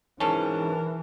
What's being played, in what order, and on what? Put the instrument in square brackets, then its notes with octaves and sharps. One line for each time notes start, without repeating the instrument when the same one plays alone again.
[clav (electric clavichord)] G#2 C#4 [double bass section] E3 [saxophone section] F#3 D4 A#4 [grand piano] A5